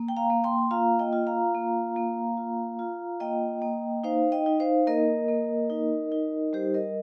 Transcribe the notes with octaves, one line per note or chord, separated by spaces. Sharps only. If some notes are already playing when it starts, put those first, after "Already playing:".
Already playing: A#3
G5
F5 A#5
A#3
G5 C6
F4 F5 A#5
D#5 G5
F4
F5 A#5
A#3
A#3
F4
F4
A#3 D#5 G5
A#3
D#4 C5 F5
D#5 G5
D#4
C5 F5
A#3 A#4 D#5
A#3
D#4
D#4
G3 G4 C5
A#4 D#5